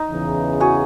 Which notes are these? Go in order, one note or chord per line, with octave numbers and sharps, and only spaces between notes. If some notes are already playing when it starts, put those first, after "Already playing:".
Already playing: D#4
E2 C#3 E3
F#4 G#4